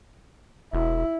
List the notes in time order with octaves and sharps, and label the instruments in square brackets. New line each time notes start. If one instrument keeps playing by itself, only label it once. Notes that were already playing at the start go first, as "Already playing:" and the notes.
[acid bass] E1 [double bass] E4